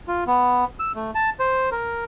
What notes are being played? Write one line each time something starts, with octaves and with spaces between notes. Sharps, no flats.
F4
B3
E6
A3
A5
C5
A#4